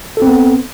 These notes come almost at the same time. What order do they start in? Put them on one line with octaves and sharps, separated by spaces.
A4 C4 B3